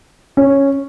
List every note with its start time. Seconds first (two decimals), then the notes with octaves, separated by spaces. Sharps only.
0.37 C#4